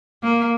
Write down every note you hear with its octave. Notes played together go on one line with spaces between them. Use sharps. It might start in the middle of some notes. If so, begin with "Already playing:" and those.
A#3